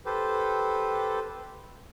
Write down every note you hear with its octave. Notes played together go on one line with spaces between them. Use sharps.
G4 A4 B4 C5